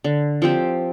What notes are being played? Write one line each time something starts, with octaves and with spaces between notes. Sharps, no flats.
D3
F3 C4 G4